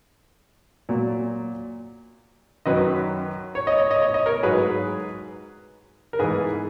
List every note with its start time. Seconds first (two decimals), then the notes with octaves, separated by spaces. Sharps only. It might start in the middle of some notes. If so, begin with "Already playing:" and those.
0.89 A#2 F#3
2.66 F#2 D#3 F#3 B4 D#5
3.55 C#5
3.67 D#5
3.78 C#5
3.91 D#5
4.02 C#5
4.14 D#5
4.26 A#4 C#5
4.43 G#2 F#3 G#4 B4
6.13 A#4
6.19 G#2 E3 G#4 B4